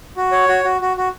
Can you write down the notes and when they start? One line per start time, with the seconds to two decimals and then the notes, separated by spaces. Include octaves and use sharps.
0.17 F#4
0.32 C#5
0.48 F#4
0.64 F#4
0.81 F#4
0.97 F#4